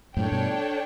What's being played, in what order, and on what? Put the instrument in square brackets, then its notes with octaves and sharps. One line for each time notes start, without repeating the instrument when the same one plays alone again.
[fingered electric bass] F#2 A2 [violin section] D4 A4 C#5 G5
[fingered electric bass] G2 B2